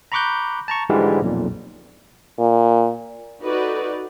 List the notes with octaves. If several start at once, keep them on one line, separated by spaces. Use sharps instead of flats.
A#5 B5 C#6 D6 F#6 G6
A5 A#5 C#6
G#2 D3 E3 F3 G3 G#3
B1 F2 A#2
A#2
D#4 F#4 A4 B4 D5